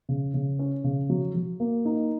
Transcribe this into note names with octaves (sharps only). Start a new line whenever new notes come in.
C#3
C#3
C#4
C#3
F#3
F#3
A#3
D#4